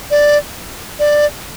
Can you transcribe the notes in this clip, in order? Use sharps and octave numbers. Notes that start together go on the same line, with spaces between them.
D5
D5